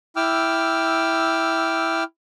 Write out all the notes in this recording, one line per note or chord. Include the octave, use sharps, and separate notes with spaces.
E4 G5 D6 E6 F6